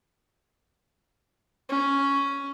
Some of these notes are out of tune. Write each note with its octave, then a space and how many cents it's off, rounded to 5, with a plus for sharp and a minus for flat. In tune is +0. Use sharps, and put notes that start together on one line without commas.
C#4 +5